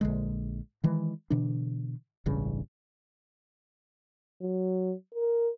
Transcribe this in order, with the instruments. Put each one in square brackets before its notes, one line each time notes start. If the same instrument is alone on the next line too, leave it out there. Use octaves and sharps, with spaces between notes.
[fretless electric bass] A#1 D3 G#3
D#3 E3 G#3
B2 D3 E3 D4
E1 A1 G2 C#3
[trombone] F#3
A#4